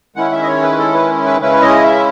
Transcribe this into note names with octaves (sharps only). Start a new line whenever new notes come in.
D#3 G#3 C#4 E4 F#5
E5
D#5
C#5
B4
A4
B4
B4
C#3 G#3 C#4 E4 B4
D#5
E5